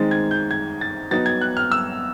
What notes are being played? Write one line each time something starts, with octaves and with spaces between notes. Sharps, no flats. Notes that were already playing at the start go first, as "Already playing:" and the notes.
Already playing: D#3 G#3 C4 D#4 A6
G#6
G6
G#6
A6
F#3 B3 D#4 A6
G#6
F#6
F6
E6